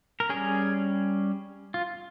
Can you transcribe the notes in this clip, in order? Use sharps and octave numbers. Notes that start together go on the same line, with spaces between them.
A#4
G3 C#4 G#4
F4